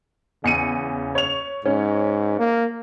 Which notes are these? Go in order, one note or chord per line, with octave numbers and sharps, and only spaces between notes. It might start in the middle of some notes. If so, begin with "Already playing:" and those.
E2 C#3 C#7 D#7
C#5 F7
G#2 C#4
A#3